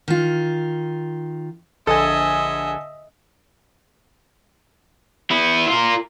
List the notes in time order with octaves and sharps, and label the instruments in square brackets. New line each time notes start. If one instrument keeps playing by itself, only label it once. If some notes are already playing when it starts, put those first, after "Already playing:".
[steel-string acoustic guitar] D#3 F4
[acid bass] A#1 [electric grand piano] D3 G#5 [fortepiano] A4 [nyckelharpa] D#5 E5
[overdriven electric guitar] B3 E4
F4 A#4